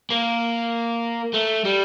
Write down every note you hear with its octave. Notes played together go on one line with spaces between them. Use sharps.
A#3
A3
G3